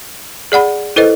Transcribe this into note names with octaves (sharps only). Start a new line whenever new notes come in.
G#4 D5 F#5 B5
E4 A4 B4 C5 D#5